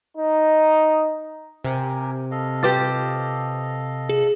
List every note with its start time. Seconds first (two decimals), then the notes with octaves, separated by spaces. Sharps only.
0.17 D#4
1.64 C3 G4 A#4 G#5
2.31 A4 D#5 F5
2.63 F4 G4 B4 D6 A6
4.09 G#4